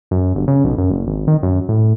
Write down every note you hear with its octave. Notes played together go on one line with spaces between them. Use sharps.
F#2
G1
C#3
B1
F#2
F#1
G#1
D#3
F#2
A2